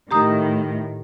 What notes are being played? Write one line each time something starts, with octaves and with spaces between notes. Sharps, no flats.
A2 D#3 G4 A#5 D#6